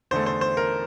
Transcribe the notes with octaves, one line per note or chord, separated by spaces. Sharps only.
E2 D3 A3 C5
C5
C5
A#4